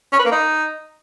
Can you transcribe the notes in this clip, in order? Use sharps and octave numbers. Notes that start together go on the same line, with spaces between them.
C#4
B4
A#3
D#4